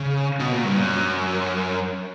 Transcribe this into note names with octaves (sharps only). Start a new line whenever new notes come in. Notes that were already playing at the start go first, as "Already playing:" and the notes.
Already playing: C#3
B2
A#2
G2
F#2